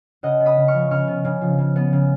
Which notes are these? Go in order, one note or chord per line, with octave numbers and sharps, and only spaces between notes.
C#3 D#5 F#5
B3
B5 D#6
C#3
C#6 F6
F3
C#3 C#6 F6
B3
C#3
F3
C#3
B3
C#3